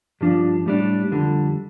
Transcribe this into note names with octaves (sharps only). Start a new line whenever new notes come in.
G2 F3 D4
A2 G3 D4
F2 D3 G3